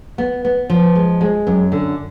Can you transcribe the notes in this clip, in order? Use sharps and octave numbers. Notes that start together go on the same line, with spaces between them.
B3
B3
F3
G#3
G#3
F#2
D3